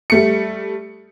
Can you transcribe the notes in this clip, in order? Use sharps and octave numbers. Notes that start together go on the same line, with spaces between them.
G3 A3 C#7